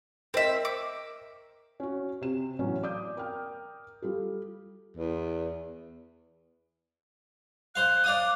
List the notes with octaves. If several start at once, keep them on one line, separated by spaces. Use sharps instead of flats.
C4 A#4 D#5 E5
D6
C#4 F#4
C3 E7
A2 E3 F#3 B3 C#4
D5 D6 D#6 G6
A#4 G5 F6
G3 F4 A4
E2
C5 F5 F#6
D5 F5 D#6